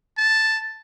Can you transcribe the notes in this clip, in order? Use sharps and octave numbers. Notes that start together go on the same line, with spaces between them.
A5